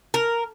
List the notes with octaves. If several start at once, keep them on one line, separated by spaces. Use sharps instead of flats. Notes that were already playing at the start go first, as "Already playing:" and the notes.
A#4